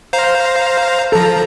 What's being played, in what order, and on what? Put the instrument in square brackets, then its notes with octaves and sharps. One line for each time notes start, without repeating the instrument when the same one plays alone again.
[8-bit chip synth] C5 F5 A#5
[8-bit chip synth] F3 A#5 [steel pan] A4